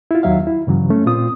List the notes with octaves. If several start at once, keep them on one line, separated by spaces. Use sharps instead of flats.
E4 F4
D#2 D#3 F#3 E5 F5
E4
G2 C#3 E3 F#3
A3 C#4
A#2 C4 F4 D#6